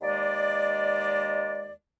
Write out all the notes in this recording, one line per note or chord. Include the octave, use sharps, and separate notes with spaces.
D#2 G#3 D5